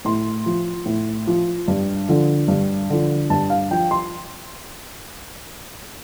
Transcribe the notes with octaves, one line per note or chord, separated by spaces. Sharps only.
A2 C6
F3
A2
F3
G2
D3 F3
G2
D3 F3
G2 A5
F5
F3 G5
C6